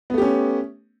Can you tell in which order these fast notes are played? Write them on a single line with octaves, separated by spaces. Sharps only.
B3 A3 G4 C#4